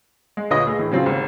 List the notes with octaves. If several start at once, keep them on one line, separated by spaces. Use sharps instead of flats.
G#3
D2 A#2 B4 C#5 D#5 D#6
A3 G#4
A2 E3
C#3 F#3 C4 F4
G#1 D#2